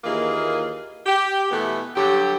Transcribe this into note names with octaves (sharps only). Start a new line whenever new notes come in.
D#2 E3 A#3 F4 G#4 D#5
G4
B2 E3 A3 B3
G2 D3 F#3 G4